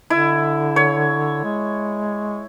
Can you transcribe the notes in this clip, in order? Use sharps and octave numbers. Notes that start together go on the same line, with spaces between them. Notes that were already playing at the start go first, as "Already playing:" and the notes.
D3 E4
C#5
G#3